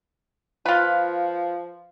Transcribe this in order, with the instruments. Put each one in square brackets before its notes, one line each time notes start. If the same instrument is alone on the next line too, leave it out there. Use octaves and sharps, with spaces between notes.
[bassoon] F3 [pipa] F4 B4